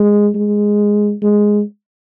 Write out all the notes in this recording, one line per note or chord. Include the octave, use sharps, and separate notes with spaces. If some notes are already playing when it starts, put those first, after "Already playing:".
Already playing: G#3
G#3
G#3